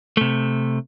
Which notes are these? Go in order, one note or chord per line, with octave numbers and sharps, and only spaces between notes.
C3 A3